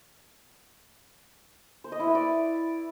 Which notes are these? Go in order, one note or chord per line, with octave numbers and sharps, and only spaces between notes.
C5
D#5
E4
B4
D5